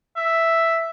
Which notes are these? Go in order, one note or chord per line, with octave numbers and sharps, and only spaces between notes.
E5